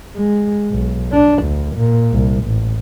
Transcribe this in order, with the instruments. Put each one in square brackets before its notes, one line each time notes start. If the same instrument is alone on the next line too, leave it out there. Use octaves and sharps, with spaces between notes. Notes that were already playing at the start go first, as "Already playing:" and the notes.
[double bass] G#3
B1
D4
D2
A#2
C2
A1